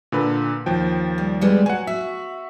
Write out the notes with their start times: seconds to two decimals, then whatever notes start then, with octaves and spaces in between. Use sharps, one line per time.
0.12 A#2 D3 B4
0.66 D#2 F3 G5
1.18 G3
1.41 G3 G#3 B3
1.66 F#3 F#5 G#5
1.87 F#4 E5